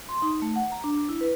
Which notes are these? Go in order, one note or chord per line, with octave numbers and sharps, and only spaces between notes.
C6
D#4
A3
F#5
A#5
D4
E4
B4